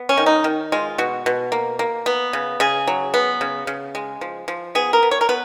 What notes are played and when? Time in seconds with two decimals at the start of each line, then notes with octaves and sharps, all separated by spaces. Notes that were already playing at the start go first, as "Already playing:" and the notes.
Already playing: B3
0.09 C#4
0.17 D#3
0.26 D#4
0.44 D#3
0.72 G#3 F4
0.98 B2 F#4
1.26 B2
1.52 A#3
1.79 A#3
2.06 B3
2.33 C#3
2.60 C#3 G#4
2.88 F#3
3.14 B3
3.41 C#3
3.67 C#3
3.95 G#3
4.21 F3
4.48 F3
4.75 B3 G#4
4.93 A#4
5.03 B3
5.11 C#5
5.21 A#4
5.29 B3 B4